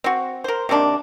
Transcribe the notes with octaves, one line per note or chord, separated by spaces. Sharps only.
C4 F#4
A#4 C5
C3 D#3 A#3 D4